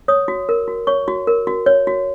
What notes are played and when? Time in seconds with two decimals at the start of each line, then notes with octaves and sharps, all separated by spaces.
0.08 C#5 D#6
0.28 F#4
0.49 A#4
0.68 F#4
0.87 C#5 C#6
1.08 F#4
1.27 A#4
1.47 F#4
1.66 C#5
1.87 F#4